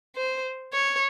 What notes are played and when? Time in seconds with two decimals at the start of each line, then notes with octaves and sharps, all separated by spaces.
0.16 C5
0.74 C#5